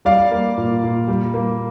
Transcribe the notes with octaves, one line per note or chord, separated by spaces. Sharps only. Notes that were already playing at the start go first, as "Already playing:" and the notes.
G3 D5 F5
A#3
A#2
A#2
G3
A#3